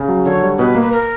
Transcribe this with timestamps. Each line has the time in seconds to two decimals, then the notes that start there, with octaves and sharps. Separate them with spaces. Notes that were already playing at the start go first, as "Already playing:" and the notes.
Already playing: C#3
0.08 F#3
0.25 D3 C#5
0.42 G3
0.58 B2 B4
0.75 A#3
0.81 B4
0.92 A#4